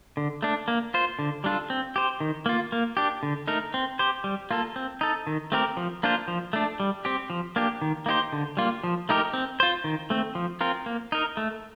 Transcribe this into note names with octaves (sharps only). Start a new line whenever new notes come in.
D3
A3 D4
A#3
F4 C5
D3
G3 D4 F4 A4
C4
G4 C5
D#3
A#3 F4
A#3
D4 G4
D3
A3 D#4 A#4
C4
G4 C5
G3
A#3 F4 A4
C4
D#4 A4
D#3
A3 C4 G4 A#4
F3
A#3 D4 F4 C5
F3
A3 D4
G3
C4 G4
F3
A#3 D4 G4
D#3
A#3 D#4 G4 C5
D3
G3 A#3 F4
F3
A3 D#4 G4 A#4
C4
F4 C5
D#3
A3 C4
F3
C4 F4 A#4
A#3
D#4 A#4
A3